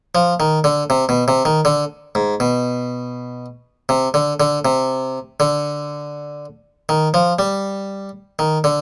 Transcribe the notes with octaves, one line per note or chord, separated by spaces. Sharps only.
F3
D#3
D3
C3
B2
C3
D#3
D3
G#2
B2
C3
D3
D3
C3
D3
D#3
F3
G3
D#3
D3